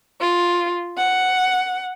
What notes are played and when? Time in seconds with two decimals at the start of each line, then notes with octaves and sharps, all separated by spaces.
0.21 F4
0.97 F#5